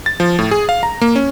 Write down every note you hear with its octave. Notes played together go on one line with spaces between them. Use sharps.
A6
F3
A2
G#4
F5
A#5
A#3
C#4